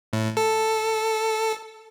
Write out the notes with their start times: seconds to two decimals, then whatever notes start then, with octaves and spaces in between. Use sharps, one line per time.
0.13 A2
0.37 A4